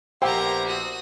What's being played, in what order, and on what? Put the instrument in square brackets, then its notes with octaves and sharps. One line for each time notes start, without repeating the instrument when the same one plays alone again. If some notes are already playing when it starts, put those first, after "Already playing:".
[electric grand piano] A#1 C5 [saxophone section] B3 E4 G4 [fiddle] A#4 A#5 [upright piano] G5
[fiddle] F#4 D#6